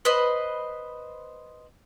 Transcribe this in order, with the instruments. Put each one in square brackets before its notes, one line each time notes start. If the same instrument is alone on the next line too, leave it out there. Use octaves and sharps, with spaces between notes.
[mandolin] B4 C5 D#5